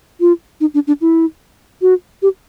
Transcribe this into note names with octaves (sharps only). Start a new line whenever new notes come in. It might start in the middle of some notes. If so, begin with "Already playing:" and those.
F4
D#4
D4
D4
E4
F#4
G4